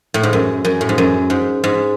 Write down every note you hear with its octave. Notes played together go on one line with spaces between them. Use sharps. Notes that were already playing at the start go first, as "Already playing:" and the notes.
A2
G#2
F#2
F#2
A2
G#2
F#2
G#2
G#2